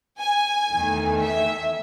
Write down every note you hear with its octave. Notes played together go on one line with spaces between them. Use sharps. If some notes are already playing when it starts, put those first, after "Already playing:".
G#5
E2 D#3 A3
E5